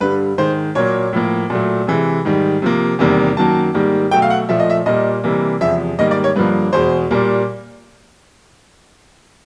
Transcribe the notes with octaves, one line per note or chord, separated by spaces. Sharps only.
G2 D3 G3 B4
G#2 D#3 G#3 C5
A#2 F#3 A#3 C#5
A2 F3 A#3
A#2 F#3 A3
C3 E3 G#3
G#2 D#3 G3
C3 F3 A#3
E2 C3 D#3 G3 A#3
F#2 D#3 F#3 A#3 A5
G#2 D#3 G3 A#3
B2 F#3 A3 G5
F5
F#5
A#2 F3 A3 E5
D#5
E5
A#2 G3 A#3 D#5
C3 E3 G3 A#3
E2 C3 F3 G#3 E5
G#2 D#3 G3 A#3 D#5
D5
C#5
G2 D3 F3 A#3 B4
E2 B2 G#3 C5
A#2 G3 A#3